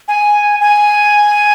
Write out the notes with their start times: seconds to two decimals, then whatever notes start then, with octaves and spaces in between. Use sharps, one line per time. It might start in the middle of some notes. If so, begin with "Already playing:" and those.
0.08 G#5
0.61 G#5